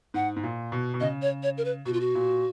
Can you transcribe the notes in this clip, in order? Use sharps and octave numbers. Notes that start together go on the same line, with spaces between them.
G#2 F#5
G#2
A#2
B2
B2
C#3 D#5
C#5
C#5
A#4
B4
B2 F#4
F4
F#4
A#2